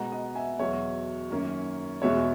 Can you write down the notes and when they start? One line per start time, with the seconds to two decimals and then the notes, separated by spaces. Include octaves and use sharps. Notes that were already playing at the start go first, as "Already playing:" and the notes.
Already playing: B2 G#3 B3 F#5 A#5
0.12 D#5 F#5
0.35 E5 G#5
0.59 E2 B2 F#3 C#5 E5
1.30 F#2 D#3 A#3 C#4
2.02 E2 B2 G#3 B3 C#5 E5